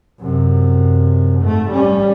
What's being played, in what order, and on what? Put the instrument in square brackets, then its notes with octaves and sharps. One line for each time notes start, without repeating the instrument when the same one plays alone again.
[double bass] F#2 C3
G#2 A3
G3 C#4